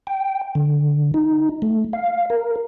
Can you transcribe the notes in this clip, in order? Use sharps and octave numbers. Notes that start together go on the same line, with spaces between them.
G5
D3
D#4
A3
F5
A#4